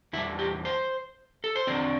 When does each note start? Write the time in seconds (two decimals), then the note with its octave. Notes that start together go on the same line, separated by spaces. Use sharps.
0.13 E2 E3 G3 E4
0.39 G4
0.65 C5
1.44 A4
1.56 C5
1.67 E2 D3 C4 D5